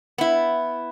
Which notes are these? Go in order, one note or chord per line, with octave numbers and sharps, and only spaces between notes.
B3 E4